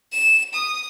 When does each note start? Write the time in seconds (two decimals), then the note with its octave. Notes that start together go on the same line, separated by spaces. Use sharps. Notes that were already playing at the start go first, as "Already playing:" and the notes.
0.12 E7
0.54 D#6